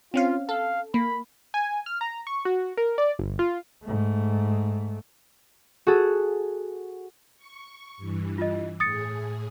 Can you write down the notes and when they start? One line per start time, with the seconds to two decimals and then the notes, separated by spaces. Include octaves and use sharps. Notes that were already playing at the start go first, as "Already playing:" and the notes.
0.14 C4 C#4 F4 F5
0.49 A4 F5
0.94 A#3 B5
1.54 G#5
1.86 F6
2.01 A#5
2.27 C#6
2.45 F#4
2.77 A#4
2.98 D5
3.19 G1
3.39 F4
3.84 G#2 A3
5.87 F#4 G#4 A4
7.37 C#6
7.97 G2 E3
8.38 F4 D#5
8.80 A2 G#4 D#6 A6 C#7